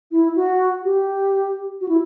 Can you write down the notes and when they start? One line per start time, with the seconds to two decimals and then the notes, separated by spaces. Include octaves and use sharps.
0.12 E4
0.36 F#4
0.84 G4
1.81 F#4
1.88 E4